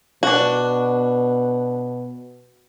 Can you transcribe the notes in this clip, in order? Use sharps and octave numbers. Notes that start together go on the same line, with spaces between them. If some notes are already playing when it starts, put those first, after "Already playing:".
B2 D4 F#4